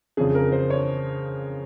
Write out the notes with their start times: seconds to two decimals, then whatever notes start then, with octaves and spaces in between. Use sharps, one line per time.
0.17 F2 C#3 G#4
0.35 A#4
0.52 C5
0.70 C#5